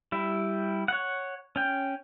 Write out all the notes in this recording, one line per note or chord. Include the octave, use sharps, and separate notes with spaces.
G3 E4
C#5 F#5
C#4 G5